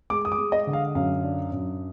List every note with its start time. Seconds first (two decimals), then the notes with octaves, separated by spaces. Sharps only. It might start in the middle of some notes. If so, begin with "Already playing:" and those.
0.10 G#3 D6
0.25 D#6
0.32 D6
0.38 G#3
0.52 D#5
0.67 D3
0.73 F5
0.95 F#2 F5
1.23 D4
1.52 F#2